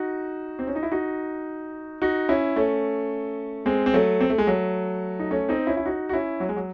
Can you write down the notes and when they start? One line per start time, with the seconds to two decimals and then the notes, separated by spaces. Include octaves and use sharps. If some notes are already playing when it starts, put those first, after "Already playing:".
Already playing: D#4 F#4
0.59 C4
0.67 C#4
0.75 D#4
0.83 E4
0.92 D#4 F#4
2.02 D#4 F#4
2.29 C#4 E4
2.56 A3 C#4
3.66 G#3 C4
3.86 C4
3.94 F#3 A3
4.20 C4
4.30 A3
4.38 G#3
4.47 F#3 A3
5.19 D#4
5.31 A3 C#4
5.49 C4 D#4
5.67 C#4 E4
5.77 E4
5.85 D#4 F#4
6.09 F#4
6.13 C#4 E4
6.40 F#3
6.49 G#3
6.56 F#3